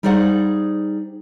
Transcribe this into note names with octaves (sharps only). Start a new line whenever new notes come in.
G3 D#4 G#4 C5 D5 F#5